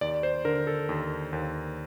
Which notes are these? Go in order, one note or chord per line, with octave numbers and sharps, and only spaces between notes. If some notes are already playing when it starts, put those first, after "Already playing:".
D#2 D5
C5
D3 A#4
A4
D#2
D#2